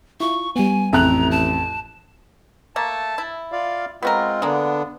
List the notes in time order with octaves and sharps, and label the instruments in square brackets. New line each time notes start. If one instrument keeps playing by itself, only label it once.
[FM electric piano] E4 F4 [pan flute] C#6
[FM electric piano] G3 B3 [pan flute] G#5
[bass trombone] A1 [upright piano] F2 F#6 [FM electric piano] E5 [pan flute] A#5
[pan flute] A5
[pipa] A3 A#3 [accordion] A5
[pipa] E4
[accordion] F4 D5 F5
[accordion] G#3 C4 F4 [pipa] B3 F#4 A#4
[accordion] D3 B3 D4 [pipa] G#3 A#3